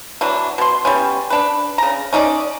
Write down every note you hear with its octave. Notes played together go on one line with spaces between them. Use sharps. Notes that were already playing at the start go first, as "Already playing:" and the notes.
E3 F#3 D4
B2 C6
G3 B3 C#4
D4 B4
C#3 A#5
C#4 D#4 A4 D5